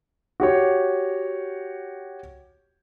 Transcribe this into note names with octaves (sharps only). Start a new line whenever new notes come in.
F#4 G4 C#5